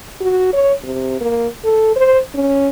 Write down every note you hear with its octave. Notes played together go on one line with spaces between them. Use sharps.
F#4
C#5
C3
A#3
A4
C5
C#4